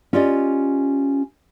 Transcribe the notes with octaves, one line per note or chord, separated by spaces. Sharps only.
C#4 F4 G4 D5 D#5